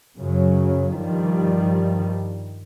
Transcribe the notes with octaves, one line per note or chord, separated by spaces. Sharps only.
F#2 C#3 F#3
G2 D#3 F3 G3